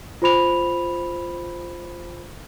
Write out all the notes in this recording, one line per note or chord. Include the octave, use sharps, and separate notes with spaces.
F4 C5 B5 F7